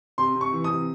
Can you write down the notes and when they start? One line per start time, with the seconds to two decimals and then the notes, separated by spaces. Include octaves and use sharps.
0.18 C3 C6
0.35 C3
0.41 C#6
0.53 E3
0.64 C3 D#6